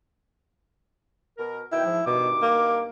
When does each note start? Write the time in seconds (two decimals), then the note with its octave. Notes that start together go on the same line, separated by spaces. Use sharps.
1.38 B2 A#4
1.72 B2 D#3 E4 G5
1.85 G#2 F3
2.07 G2 B2 D#3 D6
2.42 A#3